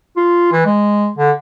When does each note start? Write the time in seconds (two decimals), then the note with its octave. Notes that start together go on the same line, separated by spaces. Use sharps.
0.17 F4
0.52 E3
0.66 G#3
1.18 D3